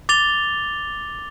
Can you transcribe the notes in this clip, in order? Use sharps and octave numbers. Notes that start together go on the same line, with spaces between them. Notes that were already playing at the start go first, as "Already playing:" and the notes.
D6 A6 F7 G7